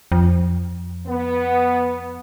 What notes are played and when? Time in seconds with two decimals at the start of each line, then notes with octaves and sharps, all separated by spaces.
0.12 F2
1.07 B3